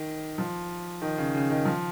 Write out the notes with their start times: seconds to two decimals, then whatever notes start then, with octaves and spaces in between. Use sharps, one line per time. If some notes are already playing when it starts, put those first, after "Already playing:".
Already playing: D#3
0.38 F3
1.02 D#3
1.18 C#3
1.34 C#3
1.50 D#3
1.65 F3